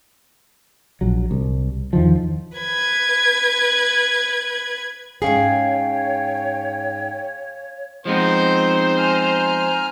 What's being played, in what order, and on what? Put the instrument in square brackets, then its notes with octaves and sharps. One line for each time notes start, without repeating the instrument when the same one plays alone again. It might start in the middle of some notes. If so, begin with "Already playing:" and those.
[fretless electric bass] A#1 F#3
C2
E2 D#3 F3
[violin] B4 G#6
[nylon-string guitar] G#2 C#4 G#4 [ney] C#5 [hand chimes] F5 G#5 C7 [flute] G5
[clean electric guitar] F3 G#3 B3 [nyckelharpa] C4 D#4 [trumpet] C5
[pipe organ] G#5 A#5 F6